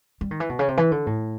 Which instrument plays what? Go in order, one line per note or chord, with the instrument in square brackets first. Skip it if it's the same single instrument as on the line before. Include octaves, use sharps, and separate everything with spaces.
[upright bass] G3
D#3
E3
B2
C#3
C3
E3
D3
A2